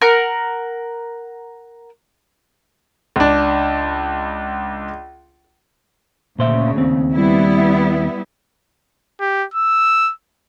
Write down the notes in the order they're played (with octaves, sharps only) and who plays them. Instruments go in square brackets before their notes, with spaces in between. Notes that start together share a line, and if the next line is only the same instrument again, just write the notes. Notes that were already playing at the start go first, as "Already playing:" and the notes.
[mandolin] A#4 F#5 F6
[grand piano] C#2 D4
[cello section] D2 C#3 [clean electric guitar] A#2 C5 E5
[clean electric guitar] D#2 C4
[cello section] G3 B3 E4
[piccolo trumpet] G4
E6